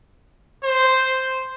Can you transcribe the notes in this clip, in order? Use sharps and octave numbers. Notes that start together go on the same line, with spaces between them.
C5